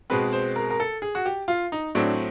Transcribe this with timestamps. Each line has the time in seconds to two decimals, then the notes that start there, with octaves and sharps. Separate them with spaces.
0.10 B2 G#3 C4 B4
0.33 C5
0.56 A#4
0.70 A#4
0.80 A4
1.02 G#4
1.15 F#4
1.26 G4
1.48 F4
1.72 D#4
1.95 A2 F#3 A3 C4 D4